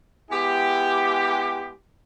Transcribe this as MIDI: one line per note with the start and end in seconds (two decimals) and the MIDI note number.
0.31 1.70 56
0.31 1.70 59
0.31 1.70 64
0.31 1.70 67